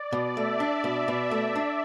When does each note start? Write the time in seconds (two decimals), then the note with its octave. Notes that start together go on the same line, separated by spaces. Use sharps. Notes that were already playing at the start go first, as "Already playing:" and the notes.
Already playing: D5
0.13 B2
0.36 A3 E5
0.60 D4
0.84 B2
1.08 B2
1.31 A3
1.56 D4